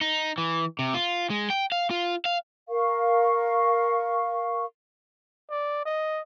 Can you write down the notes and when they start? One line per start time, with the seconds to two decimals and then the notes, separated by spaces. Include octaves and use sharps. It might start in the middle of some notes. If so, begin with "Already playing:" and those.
0.01 D#4
0.38 E3
0.79 C3
0.94 F4
1.30 G#3
1.50 G5
1.72 F5
1.91 F4
2.25 F5
2.69 A#4 F5 C#6
5.50 D5
5.85 D#5